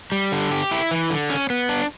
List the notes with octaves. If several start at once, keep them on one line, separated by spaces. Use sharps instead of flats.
G3
D3
G4
E4
E3
D3
C#4
B3
D4